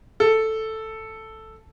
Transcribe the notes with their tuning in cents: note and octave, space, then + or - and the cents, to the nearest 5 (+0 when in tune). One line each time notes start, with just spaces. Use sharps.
A4 +0